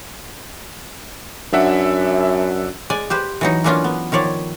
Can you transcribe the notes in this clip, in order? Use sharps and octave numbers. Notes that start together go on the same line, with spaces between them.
F#2 D4 E5 F#5
G#3 D5 G#5
G4 B4 C5
E3 F#3 D#4
E3 F#3 A#3 C#4 D4 F4
B3
D#3 F3 C#5 D5